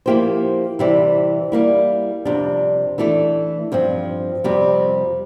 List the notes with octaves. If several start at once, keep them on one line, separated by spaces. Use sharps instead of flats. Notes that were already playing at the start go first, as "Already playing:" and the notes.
F3 A#3 E4 G4 C5
C3 E3 G3 C4 E4
G3 A#3 E4
F2 C3 G3 D4
E3 A3 D4 A4
G2 F3 C4
F2 C3 G3 C4